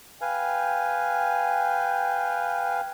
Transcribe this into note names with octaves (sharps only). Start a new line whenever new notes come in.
B4 F5 G5 G#5